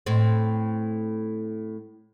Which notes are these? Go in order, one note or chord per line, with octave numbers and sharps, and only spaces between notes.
A2 C4